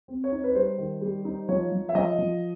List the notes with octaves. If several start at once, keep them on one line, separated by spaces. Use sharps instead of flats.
C4
C#5
D#4
B4
G3 C5
D#3
G3
D#4
F3 C#5
F3
E5
F3 D#5
F3